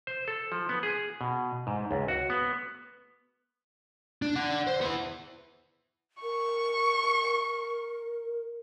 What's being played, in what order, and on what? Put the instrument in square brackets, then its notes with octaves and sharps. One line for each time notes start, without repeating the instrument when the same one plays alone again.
[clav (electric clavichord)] C5
A4
F3
B3
G#4
B2
G#2
C#2
F#4
B3
[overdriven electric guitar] D4
D5 F#5
C5
B3 E4
[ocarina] A#4 [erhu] C#6